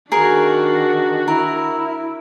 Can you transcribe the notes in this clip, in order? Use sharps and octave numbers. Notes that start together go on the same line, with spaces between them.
D#3 D4 F#4 G#4 A#4
E4 A#4